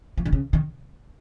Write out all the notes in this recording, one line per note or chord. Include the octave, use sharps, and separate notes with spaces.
F3
D#3
C#3
D#3